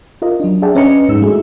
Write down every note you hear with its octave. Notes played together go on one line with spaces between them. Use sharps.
F4 A#4 D#5
F#3 D4
G#4 D5 E5 F#5 G5 A5
C#4 B4 D#5 A#5 C#7
G#2 G#3 D#4 E6
G#3 A3 E4 F#4 G#4